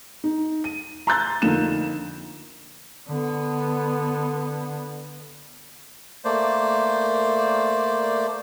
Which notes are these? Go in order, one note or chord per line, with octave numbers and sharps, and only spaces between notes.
D#4
D#7
A#5 C6 E6 F#6 G6 A6
F2 D3 A#3 D#4 E7
D3 B3
A3 A#3 C5 D5